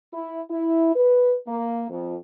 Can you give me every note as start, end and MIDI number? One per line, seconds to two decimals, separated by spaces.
0.13 0.41 64
0.51 0.93 64
0.96 1.35 71
1.48 1.86 58
1.90 2.17 41